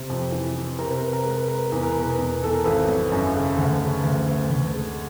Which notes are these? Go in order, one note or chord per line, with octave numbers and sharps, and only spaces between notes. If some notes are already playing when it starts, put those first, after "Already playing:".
Already playing: C3
F2
E3
E3
C3 A#4
B4
A#4
C3 B4
A#4
G#3 B4
A#4
B4
G#3 A#4
B4
A#4
E2 B4
A#4
B4
B2
G#4 A#4
E2
E2 A4
A#4
G#1 A4 B4
F#3
F#2
C#3
D2
C#3
D2
D2
D2
G#3